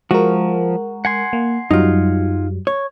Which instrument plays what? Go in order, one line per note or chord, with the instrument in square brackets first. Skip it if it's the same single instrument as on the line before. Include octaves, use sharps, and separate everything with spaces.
[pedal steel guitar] F3 [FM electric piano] G#3 A#4 [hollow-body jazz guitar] F#4
[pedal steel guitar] F#5 G#5 C6
[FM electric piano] A#3
[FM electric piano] F#2 F#3 G3 [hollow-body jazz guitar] D#4 F4
[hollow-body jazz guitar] C#5